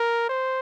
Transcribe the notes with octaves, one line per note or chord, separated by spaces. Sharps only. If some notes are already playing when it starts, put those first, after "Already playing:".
Already playing: A#4
C5